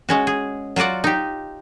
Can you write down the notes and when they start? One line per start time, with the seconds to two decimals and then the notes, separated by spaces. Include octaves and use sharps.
0.09 G#3 C#4 F#4
0.27 G#4
0.76 F#3 F4 F#4 D5 F#5
1.04 D#4 G4